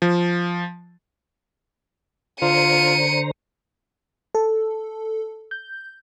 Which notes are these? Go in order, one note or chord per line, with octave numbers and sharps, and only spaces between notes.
F3
D3 F4 C5 A#5 C#7 D#7
A4
G6